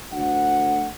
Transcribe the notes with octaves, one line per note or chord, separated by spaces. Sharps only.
D2 F#5